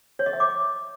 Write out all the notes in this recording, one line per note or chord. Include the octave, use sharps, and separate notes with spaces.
C#5
D#5
E5
D6